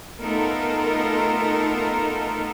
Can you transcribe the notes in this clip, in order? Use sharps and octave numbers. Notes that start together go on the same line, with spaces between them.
A3 B3 D#4 F4 A4 A#4